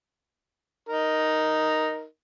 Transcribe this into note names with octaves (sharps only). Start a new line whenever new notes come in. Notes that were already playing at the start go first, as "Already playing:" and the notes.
D#4 A#4